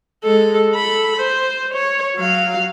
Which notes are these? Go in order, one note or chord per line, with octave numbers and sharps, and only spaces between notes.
G#3 A4
A4 B5
C5
C#5
F#3 F5